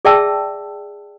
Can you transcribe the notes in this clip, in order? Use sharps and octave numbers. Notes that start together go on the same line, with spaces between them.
G#4 D5 E5 G5 A5 E6